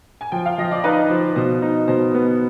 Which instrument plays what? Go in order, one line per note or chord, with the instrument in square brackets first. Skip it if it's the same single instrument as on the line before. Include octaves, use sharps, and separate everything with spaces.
[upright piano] G#5
[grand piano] F3 [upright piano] G5
[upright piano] F5
[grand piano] F3 [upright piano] D#5
[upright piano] D5
[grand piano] D#4 [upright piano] B4
[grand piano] F3 [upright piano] C5
[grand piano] B2 [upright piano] C5
[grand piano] D#4
[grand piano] B2 [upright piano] C5
[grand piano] B3